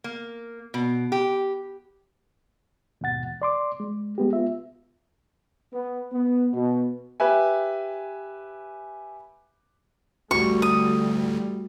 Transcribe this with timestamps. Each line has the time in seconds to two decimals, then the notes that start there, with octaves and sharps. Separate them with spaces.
0.04 A#3
0.74 B2
1.12 G4
3.01 D#2 G#2 B2 F#5 A6
3.26 E2
3.42 D5 C6 D6
3.80 G#3
4.18 G#3 B3 G4
4.33 B3 F4 E5
5.73 B3
6.12 B3
6.53 B2
7.20 G4 B4 E5 G#5
10.31 A1 D2 G3 A3 F#4 G4 C#6
10.62 D#6